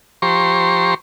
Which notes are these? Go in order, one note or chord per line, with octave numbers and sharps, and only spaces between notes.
F3 G4 C5 A#5 C6 C#6